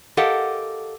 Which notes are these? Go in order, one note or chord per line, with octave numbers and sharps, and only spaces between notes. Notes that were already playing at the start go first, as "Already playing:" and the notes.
G4 A4 A#4 D#5 F5 F#5